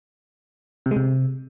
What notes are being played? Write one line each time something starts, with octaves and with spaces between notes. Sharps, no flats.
C3
G#3
C3